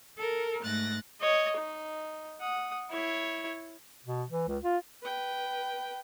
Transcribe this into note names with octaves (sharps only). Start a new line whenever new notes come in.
A4 A#4
G#2 A3 F#6 A6 A#6
C#5 D#5
D#4
F#5 D#6
E4 C#5
B2
E3
C#2
F4
B4 G5